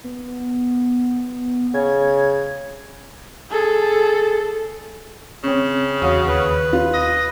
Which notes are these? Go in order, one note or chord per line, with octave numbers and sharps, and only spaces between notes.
B3
C#3 G#6
G#4 A4
C#3 C4 C#4
E2 F#4 C#5 F5 D#6
D#2 B4
F4
D#5